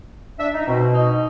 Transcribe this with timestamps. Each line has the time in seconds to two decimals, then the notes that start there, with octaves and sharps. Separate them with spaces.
0.39 D4 E5
0.54 D#4
0.67 B2 C4
0.94 D#4